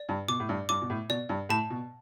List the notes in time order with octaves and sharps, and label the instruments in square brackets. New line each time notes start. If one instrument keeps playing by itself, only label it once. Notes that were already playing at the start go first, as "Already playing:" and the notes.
Already playing: [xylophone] D5
[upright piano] G2
[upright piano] B2 [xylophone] D6
[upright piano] A2
G2
[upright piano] G2 [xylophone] D6
[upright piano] B2
A2
[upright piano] B2 [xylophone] D5
[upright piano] G2
[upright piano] A2 [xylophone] A5
[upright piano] B2